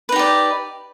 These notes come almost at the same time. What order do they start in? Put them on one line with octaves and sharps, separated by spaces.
B4 D#4 G4 D5